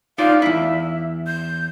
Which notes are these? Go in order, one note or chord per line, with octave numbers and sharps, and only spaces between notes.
D#4 F4 D5 F5
E2 E4 E5
G6